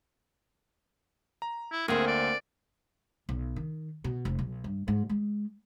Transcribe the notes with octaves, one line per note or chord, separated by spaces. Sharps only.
A#5
E4
D2 A#3 C4 G#4
D5
B1
D#3
B2
F1
B1
G2
G#2
G#3